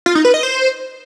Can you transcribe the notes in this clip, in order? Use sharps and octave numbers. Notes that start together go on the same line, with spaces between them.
F4
D#4
B4
D#5
C5